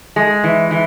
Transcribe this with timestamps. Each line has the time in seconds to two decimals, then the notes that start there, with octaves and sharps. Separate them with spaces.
0.16 G#3
0.44 E3
0.71 E3